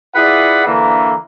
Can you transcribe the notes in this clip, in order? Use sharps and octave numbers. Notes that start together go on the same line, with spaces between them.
E4 F4 G#4 B4 D5 F#5
D3 E3 A#3